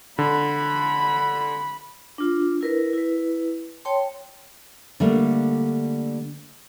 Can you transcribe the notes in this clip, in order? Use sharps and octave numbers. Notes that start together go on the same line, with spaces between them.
D3 B5
D4 F4
E4 A#4 B4
E4 B4
C#5 G5 A5 C6
D3 G3 A3 A#3 D4